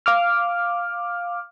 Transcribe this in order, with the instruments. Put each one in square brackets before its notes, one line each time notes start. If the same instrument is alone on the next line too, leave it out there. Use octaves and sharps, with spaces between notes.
[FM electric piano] F5 D6 F6